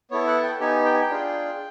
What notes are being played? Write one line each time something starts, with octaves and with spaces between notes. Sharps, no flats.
B3 E4 A4 C#5
F#5
G5
B3 D#4 G4 G#5
G5
G#5
G5
D4 F4 G#4